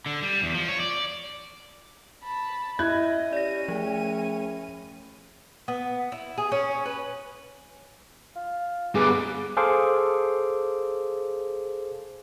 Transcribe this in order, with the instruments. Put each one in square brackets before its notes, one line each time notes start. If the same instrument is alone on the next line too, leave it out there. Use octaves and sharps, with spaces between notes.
[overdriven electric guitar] D3
G3
E2
F3
C#5
D5
[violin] A5 B5
[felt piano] E4 F#6 G#6 [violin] D#5
[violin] C#4 D#7 [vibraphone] G4 [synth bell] D5 A#6
[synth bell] F3 [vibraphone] A3 G#4 G5
[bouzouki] B3
E4
G#4
C#4
B4
[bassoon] F4
[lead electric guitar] G3 B3 [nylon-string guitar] G#4 [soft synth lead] D6
[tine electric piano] G#4 A4 C5 F5 D6